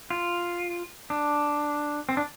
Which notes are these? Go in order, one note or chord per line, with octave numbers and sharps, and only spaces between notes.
F4
D4
C4
D4